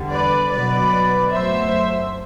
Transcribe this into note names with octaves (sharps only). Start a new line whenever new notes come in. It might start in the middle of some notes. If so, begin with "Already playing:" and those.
Already playing: E2 D3 G3
B4 D5
B2 F#3 B3 B4 D5
F#2 F#3 A3 C5 E5